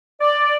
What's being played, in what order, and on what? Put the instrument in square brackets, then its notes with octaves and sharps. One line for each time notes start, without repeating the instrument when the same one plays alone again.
[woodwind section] D5